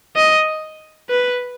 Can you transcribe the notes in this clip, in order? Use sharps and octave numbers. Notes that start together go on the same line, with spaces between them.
D#5
B4